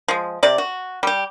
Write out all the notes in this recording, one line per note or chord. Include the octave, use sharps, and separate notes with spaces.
F3 G#3
C3 D5
F#4
G3 G4